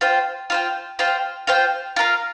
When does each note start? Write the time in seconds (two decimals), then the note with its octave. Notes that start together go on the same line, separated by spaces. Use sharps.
0.01 F4 C5 G5
0.50 F4 C5 G5
0.99 F4 C5 G5
1.47 F4 C5 G5
1.96 F4 A#4 F5